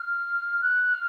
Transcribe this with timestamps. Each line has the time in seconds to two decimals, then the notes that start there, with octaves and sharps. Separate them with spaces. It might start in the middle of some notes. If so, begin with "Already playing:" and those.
Already playing: F6
0.62 F#6
0.93 F6